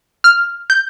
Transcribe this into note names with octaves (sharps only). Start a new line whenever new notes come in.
F6
G6